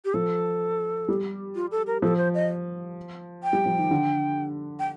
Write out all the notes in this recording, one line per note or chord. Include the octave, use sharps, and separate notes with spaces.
G4
F3 A4
G3
F4
A4
A#4
F3 A4
C5
D#5
G5
G3
F3
D#3
D3
G5